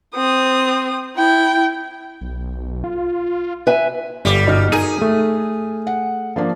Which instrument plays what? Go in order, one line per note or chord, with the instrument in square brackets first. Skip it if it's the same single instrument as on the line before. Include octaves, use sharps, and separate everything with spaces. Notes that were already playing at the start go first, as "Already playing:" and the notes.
[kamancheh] C4 D#6
E4 G5
[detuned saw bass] B1
F4
[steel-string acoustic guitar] B4 E5 G#5
[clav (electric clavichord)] G1 D5 [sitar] G3
[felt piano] B2 D#4 F6
[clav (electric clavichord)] D#4 A#4 [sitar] G#4 [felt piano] D#7
[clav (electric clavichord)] A3
[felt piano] F#5
F3 A#3 D4